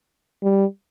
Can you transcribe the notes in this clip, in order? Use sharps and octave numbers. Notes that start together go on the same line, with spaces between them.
G3